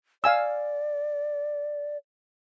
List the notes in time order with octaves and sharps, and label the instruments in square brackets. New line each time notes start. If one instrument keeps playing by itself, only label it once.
[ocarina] D5 [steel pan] F5 G#5 E6